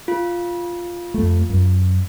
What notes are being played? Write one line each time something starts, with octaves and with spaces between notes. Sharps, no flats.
F4
F2 A3
F#2